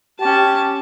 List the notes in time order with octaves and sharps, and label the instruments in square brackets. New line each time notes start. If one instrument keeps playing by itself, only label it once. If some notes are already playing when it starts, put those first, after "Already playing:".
[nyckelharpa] C#4 A5 [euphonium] G4